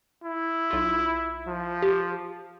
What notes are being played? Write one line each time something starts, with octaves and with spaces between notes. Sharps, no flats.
E4
B1 F4
F3
G4